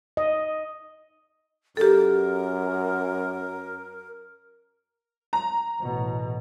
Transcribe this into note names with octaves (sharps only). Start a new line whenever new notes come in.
D#5
F#2 G4 A4 A#4
A#5
A1 B2